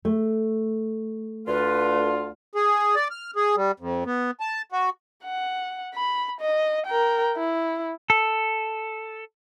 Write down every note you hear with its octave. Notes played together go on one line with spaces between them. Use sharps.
A3
D2 D3 F4 B4
G#4
D5
F6
G#4
G3
F2
B3
A5
F#4
F#5
B5
D#5
A#4 G5
E4
A4